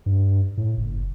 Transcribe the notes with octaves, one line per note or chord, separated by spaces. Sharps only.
G2
A2
F#1